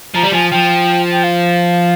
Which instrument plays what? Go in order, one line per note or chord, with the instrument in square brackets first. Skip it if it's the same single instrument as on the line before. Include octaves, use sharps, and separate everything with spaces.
[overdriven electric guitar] F3 [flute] A#5
[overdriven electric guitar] G3
[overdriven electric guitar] F3 [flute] G#5
[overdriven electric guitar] F3 [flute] G5
[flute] G5
F5